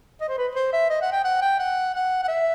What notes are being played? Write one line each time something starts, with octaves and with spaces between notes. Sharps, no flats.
D#5
C5
B4
C5
E5
D#5
F#5
G5
F#5
G5
F#5
F#5
F#5
E5